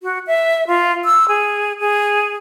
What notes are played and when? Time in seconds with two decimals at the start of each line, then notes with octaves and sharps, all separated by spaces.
0.03 F#4
0.27 E5
0.67 F4
1.05 E6
1.28 G#4
1.80 G#4